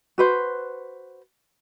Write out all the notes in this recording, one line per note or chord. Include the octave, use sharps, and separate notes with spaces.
F#4 B4 C5